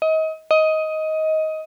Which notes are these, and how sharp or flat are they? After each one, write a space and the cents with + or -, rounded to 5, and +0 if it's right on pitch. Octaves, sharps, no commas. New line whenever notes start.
D#5 +30
D#5 +15